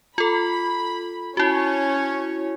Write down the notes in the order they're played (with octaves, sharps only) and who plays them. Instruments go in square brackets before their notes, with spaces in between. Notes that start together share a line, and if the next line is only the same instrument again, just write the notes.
[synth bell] F4 A4 [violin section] B5
[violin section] C#4 C#5 [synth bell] E4 F#4